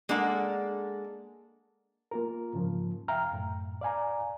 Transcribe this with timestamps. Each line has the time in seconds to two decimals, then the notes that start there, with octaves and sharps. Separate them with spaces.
0.09 G#3 A#3 D4 A4 F#5
2.11 A#3 F4 A#4
2.54 G#2 C#3 F3
3.08 E5 F5 G5 A#5 F6
3.31 F#2 A2
3.81 D5 F5 G#5 A#5